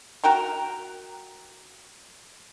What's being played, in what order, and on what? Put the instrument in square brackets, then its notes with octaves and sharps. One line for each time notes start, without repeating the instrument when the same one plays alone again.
[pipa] F#4 A#4 G5 A#5